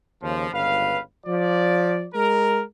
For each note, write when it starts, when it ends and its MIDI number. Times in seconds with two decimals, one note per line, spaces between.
0.22 0.51 39
0.22 0.51 49
0.22 0.51 53
0.52 0.99 31
0.52 0.99 37
0.52 0.99 71
0.52 0.99 77
1.27 2.07 53
1.27 2.07 74
2.15 2.62 56
2.15 2.62 70